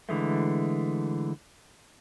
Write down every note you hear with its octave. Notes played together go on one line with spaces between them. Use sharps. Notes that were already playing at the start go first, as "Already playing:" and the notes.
D3 E3 G#3 A3